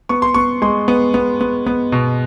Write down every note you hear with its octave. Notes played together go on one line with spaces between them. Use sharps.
B3 C#6
C6
B3 C#6
G#3 C6
B3
B3
B3
B3
B2